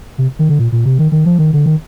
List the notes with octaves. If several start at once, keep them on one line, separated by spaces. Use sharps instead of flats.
C3
D#3
D3
A#2
A#2
C3
D#3
D#3
F3
D#3
D3
D#3